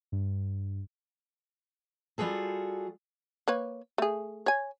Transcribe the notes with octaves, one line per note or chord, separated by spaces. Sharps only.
G2
G3 F4 F#4 G#4 A4
A#3 B4 C#5
A3 G#4
C#5 G#5